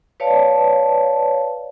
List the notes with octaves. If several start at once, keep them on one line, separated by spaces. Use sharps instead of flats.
B4 C#5 D5 F5 A5